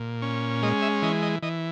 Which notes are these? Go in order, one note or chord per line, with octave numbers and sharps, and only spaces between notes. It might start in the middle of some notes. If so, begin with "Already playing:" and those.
Already playing: A#2
C#4
G#3 D#5
E5
E3 D#5
D#5
E3 D#5